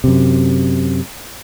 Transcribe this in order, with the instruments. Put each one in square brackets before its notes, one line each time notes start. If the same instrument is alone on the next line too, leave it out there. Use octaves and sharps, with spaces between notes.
[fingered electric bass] F#2 C3